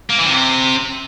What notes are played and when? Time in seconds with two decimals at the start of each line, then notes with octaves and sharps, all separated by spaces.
0.10 A#3
0.18 E3
0.27 C3